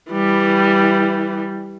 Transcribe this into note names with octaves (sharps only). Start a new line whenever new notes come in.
E3 G3